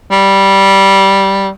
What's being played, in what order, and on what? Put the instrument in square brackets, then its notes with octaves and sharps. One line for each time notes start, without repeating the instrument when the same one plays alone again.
[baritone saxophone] G3